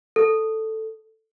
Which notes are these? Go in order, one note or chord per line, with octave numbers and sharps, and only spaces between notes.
A4